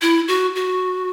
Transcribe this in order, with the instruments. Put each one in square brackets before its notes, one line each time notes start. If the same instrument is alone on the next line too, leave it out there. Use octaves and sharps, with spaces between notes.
[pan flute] E4
F#4
F#4